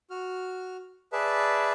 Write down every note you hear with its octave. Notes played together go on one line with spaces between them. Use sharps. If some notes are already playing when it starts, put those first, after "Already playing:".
F#4 F6
G#4 B4 D5 E5 A5